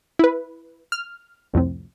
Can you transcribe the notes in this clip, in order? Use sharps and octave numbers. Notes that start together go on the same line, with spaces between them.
E4 B4
F6
C2 F2 A2 C3